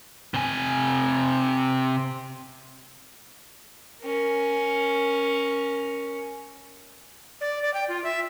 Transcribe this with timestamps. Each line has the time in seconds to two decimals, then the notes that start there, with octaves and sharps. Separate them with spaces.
0.34 C3 G#5
4.01 C#4 A#4
7.41 D5
7.62 D5
7.74 G5
7.89 F4
8.04 E5